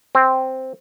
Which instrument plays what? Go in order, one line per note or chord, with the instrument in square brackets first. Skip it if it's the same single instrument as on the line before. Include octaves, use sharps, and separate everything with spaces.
[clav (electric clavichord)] C4